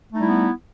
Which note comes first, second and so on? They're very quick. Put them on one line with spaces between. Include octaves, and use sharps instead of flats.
A3 D#4 G3 E4 B3